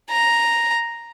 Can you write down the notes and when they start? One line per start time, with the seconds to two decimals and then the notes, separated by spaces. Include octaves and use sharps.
0.10 A#5